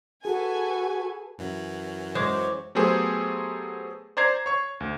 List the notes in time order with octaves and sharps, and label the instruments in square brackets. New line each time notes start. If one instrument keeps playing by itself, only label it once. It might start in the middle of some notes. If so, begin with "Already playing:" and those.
[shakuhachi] F#4 [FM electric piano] G#4 [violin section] A4 B4 G#5
[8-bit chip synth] F#2 E3 F#3
[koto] G#3 [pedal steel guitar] C5 C#5 D6
[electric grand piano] F#3 A3 B3 G4 G#4 C5
C5 D5 A#5 G#6 C7
C#5 C#6
D2